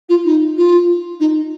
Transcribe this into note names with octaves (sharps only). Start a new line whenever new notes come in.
F4
D#4
F4
D#4